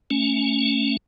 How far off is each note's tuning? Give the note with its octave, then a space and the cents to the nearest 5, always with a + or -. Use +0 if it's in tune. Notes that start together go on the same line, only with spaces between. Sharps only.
A3 +15 C#4 +5